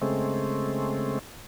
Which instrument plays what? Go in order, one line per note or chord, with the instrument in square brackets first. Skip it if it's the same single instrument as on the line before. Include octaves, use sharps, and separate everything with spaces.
[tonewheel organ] C#3 G#3 A3 C4